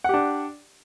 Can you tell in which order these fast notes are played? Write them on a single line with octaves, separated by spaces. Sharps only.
F#5 G4 D4